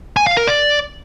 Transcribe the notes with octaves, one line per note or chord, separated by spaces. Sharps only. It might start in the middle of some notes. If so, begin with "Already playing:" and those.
G#5
F5
A#4
D5